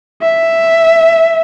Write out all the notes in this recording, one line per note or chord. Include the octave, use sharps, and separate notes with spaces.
E5